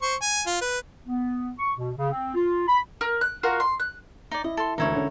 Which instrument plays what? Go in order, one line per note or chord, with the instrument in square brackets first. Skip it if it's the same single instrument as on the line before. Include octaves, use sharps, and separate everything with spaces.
[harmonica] C5 C#6
G#5
F4
B4
[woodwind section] B3
C#6
B2
C#3
C4
F4
B5
[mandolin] A#4
F#6
F4 F#4 A#4
C6
F#6
[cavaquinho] D#4 D5
[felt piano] E4 [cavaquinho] D#5
[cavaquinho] A4 C6
[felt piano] E1 D2 [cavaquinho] D#4 E4 C#5
[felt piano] D3 C#4